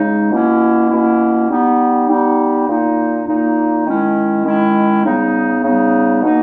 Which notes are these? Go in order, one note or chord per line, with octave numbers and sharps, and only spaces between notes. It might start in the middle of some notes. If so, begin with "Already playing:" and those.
Already playing: C#3 G#3 D#4
B2 A#3 C#4 E4
B2 A#3 C#4 E4
G3 B3 D#4
G3 B3 D#4
A#2 A#3 D#4
A#2 A#3 D#4
D#3 G#3 C#4 E4
D#3 G#3 C#4 E4
C#3 G3 B3 D#4
C#3 G3 B3 D#4
B2 A#3 D#4